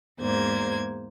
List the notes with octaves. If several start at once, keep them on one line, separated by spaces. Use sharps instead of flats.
E2 G#2 A#3 C5 G#6